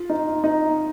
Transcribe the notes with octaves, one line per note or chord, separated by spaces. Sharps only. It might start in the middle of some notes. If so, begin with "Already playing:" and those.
Already playing: F4
D#4
D#4